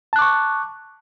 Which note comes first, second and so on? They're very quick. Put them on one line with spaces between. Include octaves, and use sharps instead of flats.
A5 F#6 D6 C#6